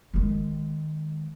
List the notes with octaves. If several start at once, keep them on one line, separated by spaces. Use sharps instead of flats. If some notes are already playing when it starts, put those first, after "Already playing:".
D#3 G#3